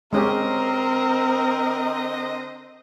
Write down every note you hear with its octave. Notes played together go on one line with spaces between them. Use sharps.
D3 G#3 C4 C#4 G4 A#4 C5 D#5